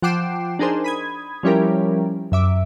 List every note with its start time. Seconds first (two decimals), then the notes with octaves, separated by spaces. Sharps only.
0.02 F3 F#5 G5 D6 C7 E7
0.59 D4 D#4 G#4 A#4 C5
0.84 B5 D#6 G#6
1.43 F3 G3 C#4 E4 G4 A#4
2.32 F#2 E5 D6